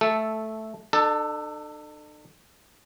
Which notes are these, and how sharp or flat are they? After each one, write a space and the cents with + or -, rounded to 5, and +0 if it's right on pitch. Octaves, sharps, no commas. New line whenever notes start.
A3 +0 A4 -10
D4 +45 A4 +5